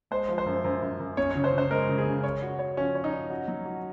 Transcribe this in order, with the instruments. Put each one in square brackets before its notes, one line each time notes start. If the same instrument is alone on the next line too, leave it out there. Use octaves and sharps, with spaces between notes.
[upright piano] G#3 [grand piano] C5
[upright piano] F3
[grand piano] C5
[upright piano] F#2
F#2
F#2
F#2
[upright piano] C#4 [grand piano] C#5
[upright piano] C#3 [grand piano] C#5
[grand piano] C5
[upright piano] C#3
[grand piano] C5
[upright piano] G#3 [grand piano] A#4
[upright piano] C#3
[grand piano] G#4
[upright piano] C#3
C#5
F#4
C#5
[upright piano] F3 [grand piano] C#4
[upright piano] C#5
[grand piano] D#4
[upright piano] C#5
F#4
F#3
F#4